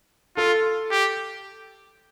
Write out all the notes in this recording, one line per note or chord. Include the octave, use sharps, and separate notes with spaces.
F4 A4
G4